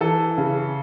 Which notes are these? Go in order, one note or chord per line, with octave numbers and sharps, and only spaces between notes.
E3 A4
C#3